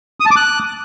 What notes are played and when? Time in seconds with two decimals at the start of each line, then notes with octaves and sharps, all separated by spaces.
0.20 D#6
0.26 A5
0.31 D6
0.36 F#6